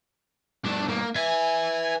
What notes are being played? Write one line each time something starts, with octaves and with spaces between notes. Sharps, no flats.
G2 A3 D4
A#3
B4 E5 G#5